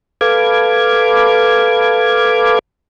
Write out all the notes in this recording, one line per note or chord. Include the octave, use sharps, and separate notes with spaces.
A4 B4 F5 D6 G#6